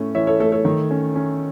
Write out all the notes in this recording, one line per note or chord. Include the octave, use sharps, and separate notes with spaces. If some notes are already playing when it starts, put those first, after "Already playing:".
Already playing: A2 A3 C#4
E3 C#5 E5
A4 C#5
A3 A4 C#5
A4 C#5
D#3
C#4
C#4